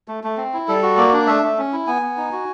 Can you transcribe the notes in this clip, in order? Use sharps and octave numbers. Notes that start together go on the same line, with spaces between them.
A3
A3
C4
E4
G3 A4
F#4
A#3 D5
D4
A3 E5
A3
C#4
E4
B3 G#5
B3
D#4
F#4